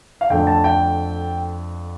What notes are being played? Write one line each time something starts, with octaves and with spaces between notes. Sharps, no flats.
F5
F2 D3 A3 G5
A5
G5